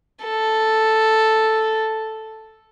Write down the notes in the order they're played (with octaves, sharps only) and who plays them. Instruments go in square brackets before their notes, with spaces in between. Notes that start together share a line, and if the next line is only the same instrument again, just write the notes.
[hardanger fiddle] A4